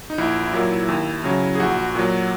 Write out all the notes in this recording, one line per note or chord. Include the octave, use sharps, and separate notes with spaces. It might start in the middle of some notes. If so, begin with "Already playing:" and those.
D#4
A#1 E4
A#2 F#3
D#2
C#3 F#3
G#4
A#1 F#4
A#2 F#3